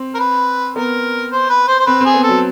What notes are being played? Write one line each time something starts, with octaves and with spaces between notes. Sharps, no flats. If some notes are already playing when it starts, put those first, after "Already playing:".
Already playing: C4
A#4
B4
B3 A#4
C5
B4
C5
C5
C4 B4
C4 G#4
B3
A4
F#3